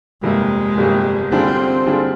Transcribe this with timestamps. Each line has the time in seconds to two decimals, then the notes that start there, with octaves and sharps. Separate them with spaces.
0.23 G1 F2 C3 G3 G#3 A#3
0.77 G1 F2 C3 G3 A#3
1.32 D3 G3 C4 D4 F4 G#4
1.86 D3 G3 D4 F4 G#4